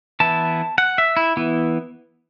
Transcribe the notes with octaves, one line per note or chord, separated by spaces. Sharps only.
E3 B3 E4 A5
F#5
E5
E4
E3 B3 E4